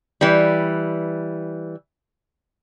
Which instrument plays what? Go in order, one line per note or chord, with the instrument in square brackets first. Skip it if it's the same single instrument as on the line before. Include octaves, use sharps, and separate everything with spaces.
[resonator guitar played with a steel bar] E3 G3